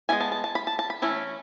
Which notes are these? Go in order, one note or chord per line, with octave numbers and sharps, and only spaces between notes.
G#3 B3 E4 G#5
A5
A5
A5
B5
A5
A5
B5
E3 A3 C#4 E4